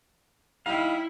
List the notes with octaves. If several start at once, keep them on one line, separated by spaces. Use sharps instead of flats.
G3 D#4 E4 F5